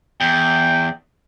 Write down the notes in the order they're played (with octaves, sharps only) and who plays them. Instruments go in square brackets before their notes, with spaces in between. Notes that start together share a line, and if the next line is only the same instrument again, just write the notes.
[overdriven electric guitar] E2 [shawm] G5